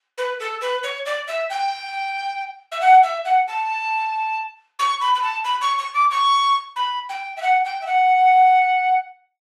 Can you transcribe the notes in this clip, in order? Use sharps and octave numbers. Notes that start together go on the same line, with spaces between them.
B4
A4
B4
C#5
D5
E5
G5
E5
F#5
E5
F#5
A5
C#6
B5
B5
A5
B5
C#6
C#6
D6
C#6
B5
G5
E5
F#5
G5
E5
F#5